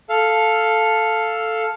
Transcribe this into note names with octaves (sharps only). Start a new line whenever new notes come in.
A4 F5